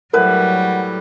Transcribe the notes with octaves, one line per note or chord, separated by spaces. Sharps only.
A2 F#3 G3 A#4 B4 E5 F#5